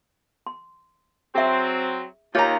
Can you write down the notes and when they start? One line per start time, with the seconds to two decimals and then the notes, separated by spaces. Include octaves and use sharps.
0.47 C6
1.35 F#3 C4 G#4 E5
2.35 D#2 F4 C#5 A#5